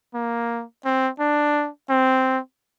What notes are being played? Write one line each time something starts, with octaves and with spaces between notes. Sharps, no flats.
A#3
C4
D4
C4